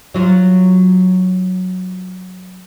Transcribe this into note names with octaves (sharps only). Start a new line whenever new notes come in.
F#3 F4